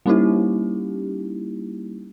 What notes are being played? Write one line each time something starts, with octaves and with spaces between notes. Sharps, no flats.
G3 A#3 C#4 D#4 E4 G4